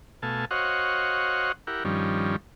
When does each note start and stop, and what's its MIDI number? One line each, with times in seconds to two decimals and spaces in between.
0.22 0.45 47
0.22 0.45 57
0.22 0.45 77
0.22 0.45 80
0.22 0.45 81
0.51 1.52 66
0.51 1.52 72
0.51 1.52 73
0.51 1.52 75
0.51 1.52 77
0.51 1.52 78
1.67 1.84 64
1.67 1.84 67
1.67 1.84 70
1.67 1.84 78
1.85 2.36 43
1.85 2.36 51
1.85 2.36 53
1.85 2.36 55
1.85 2.36 61